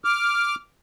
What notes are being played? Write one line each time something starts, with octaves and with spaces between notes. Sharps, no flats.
D6 F6